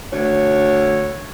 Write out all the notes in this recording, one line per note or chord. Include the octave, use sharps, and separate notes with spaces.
D2 C#5